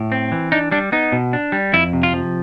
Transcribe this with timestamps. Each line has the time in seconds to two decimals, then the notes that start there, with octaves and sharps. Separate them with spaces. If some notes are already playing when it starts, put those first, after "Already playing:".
Already playing: A2
0.12 C4
0.32 E3
0.52 D4 D#4
0.71 G3 D4
0.92 B3 D#4
1.12 B2
1.33 D4
1.52 G3
1.73 F2 E4
1.93 C3
2.03 F4
2.13 F3